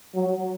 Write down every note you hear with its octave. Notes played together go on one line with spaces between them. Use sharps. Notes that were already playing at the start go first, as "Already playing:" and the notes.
F#3